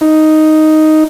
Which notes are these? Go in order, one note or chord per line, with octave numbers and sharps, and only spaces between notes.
D#4